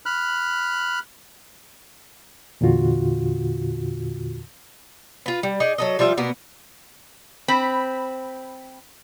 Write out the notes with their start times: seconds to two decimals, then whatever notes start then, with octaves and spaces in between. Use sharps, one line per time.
0.06 B5 F6 F#6
2.61 E2 A#2 D3 F4 F#4
5.26 F4 B4
5.43 G3
5.60 D#4 G#4 D5
5.78 F#3 A4 D#5
5.99 F3 G3 F4 E5
6.17 B2 A#3 B3
7.48 C4 B5